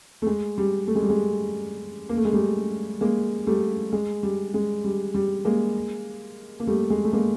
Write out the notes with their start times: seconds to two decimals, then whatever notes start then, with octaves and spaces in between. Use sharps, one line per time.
0.22 A3
0.27 G#3
0.58 G3
0.87 A3
0.95 G#3
1.02 G3
1.10 G#3
2.09 A#3
2.17 A3
2.25 G#3
2.33 G3 A3
3.01 G#3 A#3
3.47 G3 A3
3.93 G#3
4.23 G3
4.54 G#3
4.84 G3
5.14 G3
5.45 G#3 A#3
6.60 A#3
6.67 G3 A3
6.90 G#3
7.05 A3
7.13 G#3 A#3